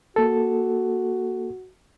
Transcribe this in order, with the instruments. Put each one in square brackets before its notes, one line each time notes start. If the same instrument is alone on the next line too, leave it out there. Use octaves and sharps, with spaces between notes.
[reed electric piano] A#3 A4 [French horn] F#4